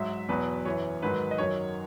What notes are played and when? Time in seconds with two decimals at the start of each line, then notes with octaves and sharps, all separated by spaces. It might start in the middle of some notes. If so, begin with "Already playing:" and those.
Already playing: G#2 F#3 E5
0.29 E2 B2 F#3 B4
0.65 F#2 E3 C#5
1.02 G#2 D#3 F#3 B4
1.31 D#5
1.38 F#2 D#3 F#3 C#5